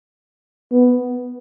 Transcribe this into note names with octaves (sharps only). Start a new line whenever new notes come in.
B3